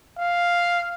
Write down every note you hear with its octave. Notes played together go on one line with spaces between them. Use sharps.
F5